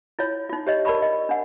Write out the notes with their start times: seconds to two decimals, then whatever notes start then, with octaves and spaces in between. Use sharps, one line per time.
0.19 E4 F4 C#5
0.49 D#4 F4
0.67 G4 C#5 D#5
0.85 A#4 D5 A5 B5 C#6
1.02 D#5
1.29 D4 F#5